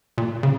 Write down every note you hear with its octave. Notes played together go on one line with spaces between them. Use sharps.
A#2
C#3